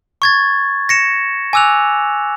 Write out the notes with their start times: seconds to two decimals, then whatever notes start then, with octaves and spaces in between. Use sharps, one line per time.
0.22 C#6 G#6 A6
0.89 A#6 C#7 E7
1.53 G#5 D6 E6 F#6 F7